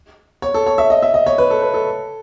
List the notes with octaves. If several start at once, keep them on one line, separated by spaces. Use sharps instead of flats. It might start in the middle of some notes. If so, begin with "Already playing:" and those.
C#5
A4
C#5
E5
D#5
E5
D#5
C#5
B4
A4
B4
A4